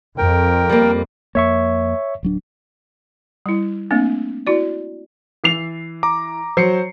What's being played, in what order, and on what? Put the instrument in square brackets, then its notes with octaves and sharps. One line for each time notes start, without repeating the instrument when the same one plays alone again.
[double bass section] F2 [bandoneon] A#4 G5
[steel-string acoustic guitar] G3 A#3
[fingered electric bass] F2 A#3 [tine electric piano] C#5 E5 C#6
[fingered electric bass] D1 F#3 D4
[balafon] G3 E4
A3 A#3 C4 D4
E4 F#4 D5
[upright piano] E3 C7 F7
[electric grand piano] A#5 D6
[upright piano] F#3 [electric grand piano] C5 C7 C#7